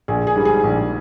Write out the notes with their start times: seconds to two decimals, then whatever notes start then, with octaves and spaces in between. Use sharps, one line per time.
0.08 A#1 G#4
0.27 G#4
0.36 G#2 G3
0.45 G#4
0.64 A#1